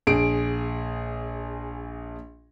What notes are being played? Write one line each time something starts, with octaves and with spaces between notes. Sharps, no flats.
A#1 G#4 D7